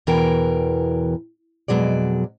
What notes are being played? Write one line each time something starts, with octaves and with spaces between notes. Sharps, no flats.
E2 B2 E3 A#4 G5
F2 B2 F#3 G#3 D5